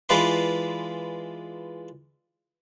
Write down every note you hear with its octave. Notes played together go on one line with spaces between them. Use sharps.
E3 G#3 D4 F4 B4 C6